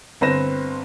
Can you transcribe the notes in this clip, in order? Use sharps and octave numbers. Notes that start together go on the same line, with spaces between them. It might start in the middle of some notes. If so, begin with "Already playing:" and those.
G1 C4 B4 C5 A#6 E7